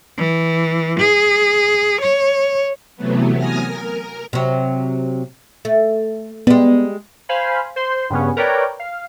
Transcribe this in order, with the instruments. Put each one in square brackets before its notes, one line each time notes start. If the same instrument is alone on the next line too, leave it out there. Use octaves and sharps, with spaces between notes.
[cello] E3
G#4
C#5
[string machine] C3 E3 F#3 A3 B3
G#5 D#6 F6 A#6
A#4
[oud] C3 F#3
A3
[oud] G3 G#3 [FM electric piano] B3
[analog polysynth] C5 F5 G#5 B5
C5 C6
G2 C#3 B3 C#4
A#4 B4 C#5 D5 G5
F5